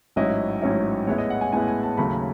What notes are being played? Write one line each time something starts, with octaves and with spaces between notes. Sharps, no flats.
A1 G#2 F#3 C#4 E4 D#5
A1 G#2 F#3 C#4 E4
A2 G#3 B3 E4 C#5
D#5
F#5
G#5
A2 G#3 B3 E4 G#5
G#5
A5
D#2 C#3 F#3 A3 B5